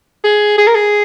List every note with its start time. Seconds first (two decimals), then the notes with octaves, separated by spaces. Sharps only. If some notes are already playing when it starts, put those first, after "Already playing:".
0.24 G#4
0.58 G#4
0.67 A#4
0.75 G#4